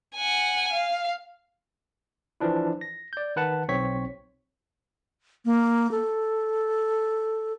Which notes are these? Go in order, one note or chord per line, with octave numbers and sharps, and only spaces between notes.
F#5 G#5
F5
E3 F3 D4 E4
A#6
D5 G6
D#3 B4 F#5 A5
B1 C4 C#5 C#6 B6
A#3
A4